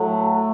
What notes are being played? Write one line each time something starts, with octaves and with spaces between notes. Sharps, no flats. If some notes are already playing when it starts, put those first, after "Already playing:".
Already playing: A2 F#3 A3